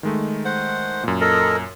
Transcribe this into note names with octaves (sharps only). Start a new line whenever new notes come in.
D#3 G#3 A3
C5 F#5
F#2 A#2
A4 A#4 D#5